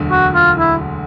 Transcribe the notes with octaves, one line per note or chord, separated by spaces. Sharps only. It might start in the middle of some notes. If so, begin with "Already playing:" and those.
Already playing: E1 D2 D3 F#3
F#4
F4
E4